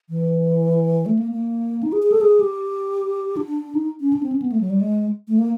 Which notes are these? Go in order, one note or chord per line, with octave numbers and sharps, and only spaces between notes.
E3
A3
A#3
A#3
D#4
G#4
G#4
A4
G#4
G4
D4
D#4
C#4
D4
C4
C#4
B3
A3
F#3
G3
G#3
A3
A#3